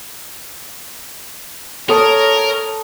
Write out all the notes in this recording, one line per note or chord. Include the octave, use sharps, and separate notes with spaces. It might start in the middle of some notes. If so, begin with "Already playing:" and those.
A4 A#4 C#5 D#6 E6